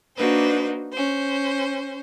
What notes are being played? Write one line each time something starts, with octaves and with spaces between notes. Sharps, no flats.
A#3 D4 D#4 F#4 B4 C5
C#4 C5